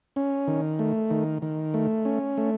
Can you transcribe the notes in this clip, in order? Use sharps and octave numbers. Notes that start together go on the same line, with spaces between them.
C#4
D#3
A3
D#3
D#3
A3
C#4
A3